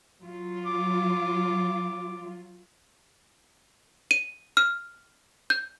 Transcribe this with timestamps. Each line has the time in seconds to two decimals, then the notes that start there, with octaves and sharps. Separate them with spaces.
0.20 F#3 F4
0.66 D6
4.11 D#7
4.57 F6
5.50 G6